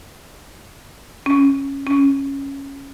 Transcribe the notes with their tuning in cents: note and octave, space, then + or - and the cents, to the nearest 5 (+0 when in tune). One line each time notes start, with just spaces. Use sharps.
C#4 -5
C#4 -5